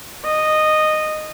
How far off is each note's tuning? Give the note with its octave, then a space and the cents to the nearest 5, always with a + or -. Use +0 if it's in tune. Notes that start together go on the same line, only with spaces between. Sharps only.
D#5 -10